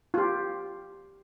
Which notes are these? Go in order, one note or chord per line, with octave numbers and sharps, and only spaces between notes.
F4 G4